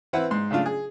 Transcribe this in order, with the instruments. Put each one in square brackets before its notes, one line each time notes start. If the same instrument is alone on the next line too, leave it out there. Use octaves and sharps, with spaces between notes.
[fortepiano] E3 C4 E4 B4 F#5
G#2 C6
C#3 A3 D4 F4
G#4